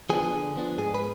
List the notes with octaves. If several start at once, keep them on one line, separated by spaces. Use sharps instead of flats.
F3 B3 D4 G#4
D3
F3 B3 D4
G#2 G#4
B4